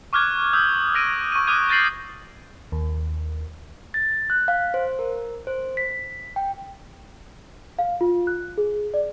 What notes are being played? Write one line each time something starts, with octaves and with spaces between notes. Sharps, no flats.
C#6 D6 F6 F#6 G#6
D#6 E6 G6
D#6 E6 A#6 D7 D#7
C#6 D#7
D6 D#6 F6 F#6 G#6 D#7
G6 A6 A#6 C7 F#7
D#2
A6
F#6
F5
C5
A#4
C5
B6
G5
F5
F4
F#6
G#4
D5